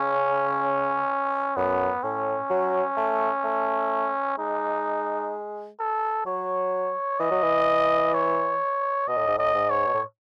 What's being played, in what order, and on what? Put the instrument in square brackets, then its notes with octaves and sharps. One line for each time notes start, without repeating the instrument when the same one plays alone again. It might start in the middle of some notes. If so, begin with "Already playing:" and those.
Already playing: [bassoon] C#3 [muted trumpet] C#4
[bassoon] F#2 [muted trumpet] B3
[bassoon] A2 [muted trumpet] C#4
[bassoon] F#3
A3
A3
[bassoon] G#3 [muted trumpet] D#4
[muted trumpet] A4
[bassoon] F#3 [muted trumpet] C#5
[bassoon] E3 [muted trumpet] D#5
[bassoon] F#3
E3
[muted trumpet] C#5
[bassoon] B2 [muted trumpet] D#5
[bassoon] A2
G#2
[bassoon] A2 [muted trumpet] D#5
[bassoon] G#2
[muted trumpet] C#5
[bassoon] B2
A2